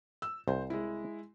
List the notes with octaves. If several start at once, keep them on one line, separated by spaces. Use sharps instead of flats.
E6
C2 C5
G#3 E4